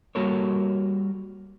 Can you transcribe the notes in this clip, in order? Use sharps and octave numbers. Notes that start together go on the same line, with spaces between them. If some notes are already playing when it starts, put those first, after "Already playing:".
G3 A#3 F#4 A4 A#4 C#5